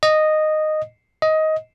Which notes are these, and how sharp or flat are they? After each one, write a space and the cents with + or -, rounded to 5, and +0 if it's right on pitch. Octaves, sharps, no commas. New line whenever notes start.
D#5 -10
D#5 +15